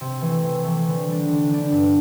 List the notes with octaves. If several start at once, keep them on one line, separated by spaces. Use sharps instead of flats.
C3
E3 A3
C3
E3 A3
D3
G3 D4
D3
G3 D4
G2